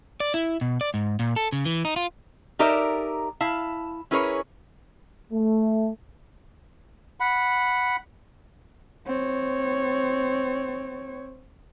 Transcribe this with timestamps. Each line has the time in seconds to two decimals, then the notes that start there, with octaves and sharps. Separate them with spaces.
0.20 D5
0.34 E4
0.61 B2
0.81 D5
0.94 G#2
1.19 A#2
1.36 A4
1.52 C#3
1.65 E3
1.85 D#4
1.96 F4
2.59 D#4 G4 A4 A#4 D5 E5
3.41 E4 F5 A5
4.11 C#4 E4 G#4 A#4 B4 C#5
5.32 A3
7.20 F#5 B5
9.07 C4 C#5